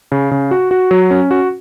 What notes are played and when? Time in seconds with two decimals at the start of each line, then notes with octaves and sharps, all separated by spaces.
0.12 C#3
0.31 C#3
0.51 F#4
0.71 F#4
0.91 F#3
1.11 C#4
1.31 F#4